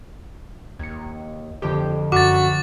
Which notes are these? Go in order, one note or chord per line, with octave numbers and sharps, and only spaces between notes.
D#2 G#6 C#7
F2 D3 A3 G4
F#2 F#4 D6 F6 A6